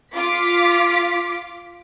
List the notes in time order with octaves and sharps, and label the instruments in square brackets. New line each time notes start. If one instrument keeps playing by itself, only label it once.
[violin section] F4 D6 B6